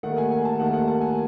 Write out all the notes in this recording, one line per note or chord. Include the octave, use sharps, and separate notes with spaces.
D#2 D#3 A3 F#5
G#5
G#5
A5
D#2 D#3 A3 F#5
F#5
A5
G#5